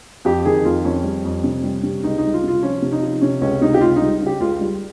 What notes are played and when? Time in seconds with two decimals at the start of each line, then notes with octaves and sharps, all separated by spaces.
0.25 F2 G4
0.45 D#3 G#4
0.65 F2 F4
0.84 F2 C#4
1.04 G3
1.25 F2
1.44 C3
1.63 G3
1.83 C3
2.03 C#2 D#4
2.18 D#4
2.23 G3
2.33 F4
2.43 C3 F4
2.63 F3 C#4
2.82 C3
2.92 D#4
3.02 F3
3.21 C3 C#4
3.41 C#2 C#4
3.61 C3 D#4
3.74 G4
3.81 C#2 F4
3.96 D#4
4.02 G3
4.21 C#3
4.26 G4
4.40 C#2 F4
4.61 G3